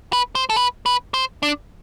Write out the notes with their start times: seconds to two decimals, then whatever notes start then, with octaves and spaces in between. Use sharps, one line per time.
0.13 B4
0.35 C5
0.50 A4
0.56 B4
0.86 B4
1.14 C5
1.43 D4